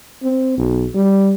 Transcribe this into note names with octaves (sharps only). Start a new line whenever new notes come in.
C4
B1
G3